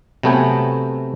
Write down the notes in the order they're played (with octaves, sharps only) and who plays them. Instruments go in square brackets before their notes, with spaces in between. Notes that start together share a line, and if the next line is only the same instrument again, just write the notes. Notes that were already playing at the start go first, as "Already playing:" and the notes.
[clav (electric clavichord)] C3 F#3 A3 B3 G5 G#5